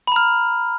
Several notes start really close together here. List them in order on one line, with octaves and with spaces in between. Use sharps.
B5 A#5 F6